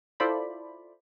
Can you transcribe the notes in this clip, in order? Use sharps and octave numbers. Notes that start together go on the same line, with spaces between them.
E4 F4 A4 C5 D5 B5